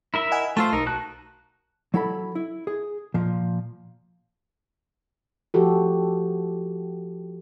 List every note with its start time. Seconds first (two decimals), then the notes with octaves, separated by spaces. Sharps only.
0.14 E4 A#4 E5
0.31 D#5 F#5 G#5
0.57 A3 F4 C5 A5 E6
0.73 B1 D#4 A#4
0.86 F#4 A5 F#6
1.94 F#3 E4 A4 B5
2.35 E4
2.67 G#4
3.14 A#2 F3
5.54 F3 F#4 G4 A4